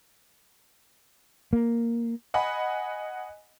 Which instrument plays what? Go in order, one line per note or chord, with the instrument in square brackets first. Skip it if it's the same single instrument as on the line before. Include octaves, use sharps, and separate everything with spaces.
[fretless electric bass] A#3
[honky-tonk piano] D#5 F#5 G#5 B5